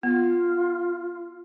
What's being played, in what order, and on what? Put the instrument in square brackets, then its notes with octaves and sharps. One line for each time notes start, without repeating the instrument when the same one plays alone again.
[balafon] B3 [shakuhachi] F4